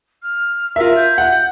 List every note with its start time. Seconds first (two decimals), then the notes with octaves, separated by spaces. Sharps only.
0.22 F6
0.76 F4 A#4 E5
0.96 G6
1.18 F#5